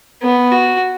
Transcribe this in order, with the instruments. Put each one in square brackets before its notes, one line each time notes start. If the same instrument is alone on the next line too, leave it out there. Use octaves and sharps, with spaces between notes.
[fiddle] B3
F#4